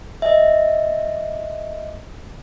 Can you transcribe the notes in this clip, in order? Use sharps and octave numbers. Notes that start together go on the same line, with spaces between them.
D#5 E5